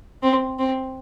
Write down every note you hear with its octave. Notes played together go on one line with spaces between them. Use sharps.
C4
C4